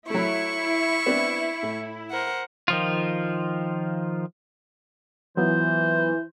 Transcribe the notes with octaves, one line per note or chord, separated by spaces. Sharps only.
F#3 A3 E4 C#6
B3 C4 D4
A2
A#4 C5 F#5
D#3 F3 F4
E3 F#3 B3 F4 C5